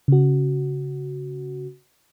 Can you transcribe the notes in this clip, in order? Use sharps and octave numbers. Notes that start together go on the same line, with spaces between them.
C#3 F#4